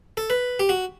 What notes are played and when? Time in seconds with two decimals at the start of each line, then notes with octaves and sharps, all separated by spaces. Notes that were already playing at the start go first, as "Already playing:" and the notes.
0.17 A4
0.30 B4
0.60 G4
0.69 F#4